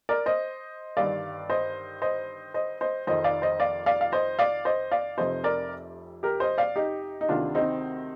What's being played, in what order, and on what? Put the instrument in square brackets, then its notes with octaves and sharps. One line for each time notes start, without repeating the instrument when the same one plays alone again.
[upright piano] A#4 D5
C5 D#5
G1 G2 D#3 D5 F5
C5 D#5
C5 D#5
C5 D#5
C5 D#5
F1 F2 D#3 C5 D#5
D5 F5
C5 D#5
D5 F5
D5 F5
F5
C5 D#5
D5 F5
C5 D#5
D5 F5
F1 F2 C3 C5 D#5
A#4 D5
G4 A#4
C5 D#5
D5 F5
D#4 G4
D#4
D2 C3 D#3 D4 F4
C4 D#4